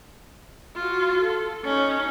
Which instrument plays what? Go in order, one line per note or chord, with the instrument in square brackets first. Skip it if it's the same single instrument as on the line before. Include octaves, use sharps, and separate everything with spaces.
[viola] F4 F#4
A4
C#4 D#4